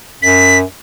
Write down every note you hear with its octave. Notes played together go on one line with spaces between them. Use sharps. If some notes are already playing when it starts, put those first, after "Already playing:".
F#2 B6